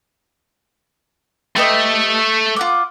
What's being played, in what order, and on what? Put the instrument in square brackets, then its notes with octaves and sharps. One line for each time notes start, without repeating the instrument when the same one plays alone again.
[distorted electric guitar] A3 [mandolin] G4 B4 D#5
[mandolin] F4 F#5 D6